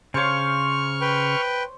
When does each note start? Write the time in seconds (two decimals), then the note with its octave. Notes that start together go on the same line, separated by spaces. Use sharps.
0.14 C#3 C5 C#5 F5 C#6 F6
1.01 B4 G5